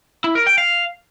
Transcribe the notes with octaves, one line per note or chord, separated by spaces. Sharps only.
E4
A#4
G5
F5